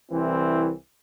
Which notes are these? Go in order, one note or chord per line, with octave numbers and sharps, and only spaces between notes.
C2 E3 C4 E4